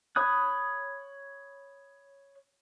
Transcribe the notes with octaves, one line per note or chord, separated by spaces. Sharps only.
C#5 B5 D#6 F#6